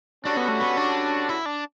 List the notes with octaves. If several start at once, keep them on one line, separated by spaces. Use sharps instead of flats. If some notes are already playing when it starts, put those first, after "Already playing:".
D3 G3 C#4 D4 F#4
B3
A3
B3
D4
E4
D4